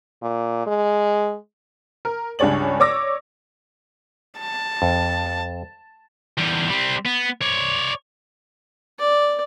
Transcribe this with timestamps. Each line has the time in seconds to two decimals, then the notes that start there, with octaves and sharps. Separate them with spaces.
0.22 A#2
0.67 G#3
2.05 A#4
2.39 C#2 G2 G#4 C#5 D5 F#7
2.80 C#5 D5 D6 E6 A#6
4.39 A5
4.82 F2
6.38 E2 G3
6.70 G3 C4
7.06 B3
7.42 C#5 D5
8.99 D5